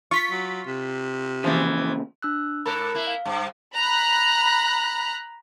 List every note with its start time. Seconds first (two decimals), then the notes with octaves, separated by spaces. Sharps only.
0.11 F4 C#6 B6
0.31 F#3
0.66 C3
1.44 A#2 C#3 E3 F3
2.22 D4 E6 F#6
2.66 G#2 A4 A#4 B5 F#6
2.94 A#3 E4
3.07 F5
3.25 G2
3.74 A#5 B5 F#6